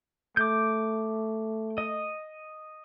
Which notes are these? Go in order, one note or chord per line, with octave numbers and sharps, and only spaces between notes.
A3 D6 G6
D#5